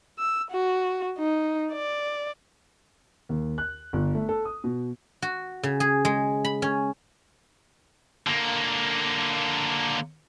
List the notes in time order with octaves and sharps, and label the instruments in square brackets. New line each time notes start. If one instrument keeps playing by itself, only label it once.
[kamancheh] E6
F#4
D#4
D5
[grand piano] D#2
F#6
G1
A3
A4
D#6
B2
[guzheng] F#4
C#3
G#4
G#3
B5
C#4
[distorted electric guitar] D3 A#3